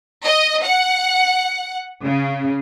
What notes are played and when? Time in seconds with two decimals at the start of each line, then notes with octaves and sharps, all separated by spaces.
0.25 D#5
0.65 F#5
2.03 C#3